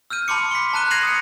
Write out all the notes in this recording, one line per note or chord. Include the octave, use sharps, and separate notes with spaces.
E6 F6 G6 D#7
A5 B5 C6 D6 C#7
B6 G7
A5 A#5 F#6 D#7 G7
G#6 A#6 C7 D#7 F7 F#7
D#6 C#7